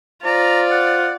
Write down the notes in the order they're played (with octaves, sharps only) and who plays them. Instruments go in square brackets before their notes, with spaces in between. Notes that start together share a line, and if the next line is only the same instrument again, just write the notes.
[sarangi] F4 [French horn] C5 [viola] D5 [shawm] A#5
[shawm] F#5